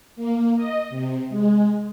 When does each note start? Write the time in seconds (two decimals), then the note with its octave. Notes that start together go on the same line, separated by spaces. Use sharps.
0.16 A#3
0.56 D#5
0.90 C3
1.30 G#3